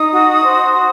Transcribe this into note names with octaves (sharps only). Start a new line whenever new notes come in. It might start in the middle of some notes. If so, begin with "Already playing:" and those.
Already playing: D#4 D#6
F#4
C5
F#4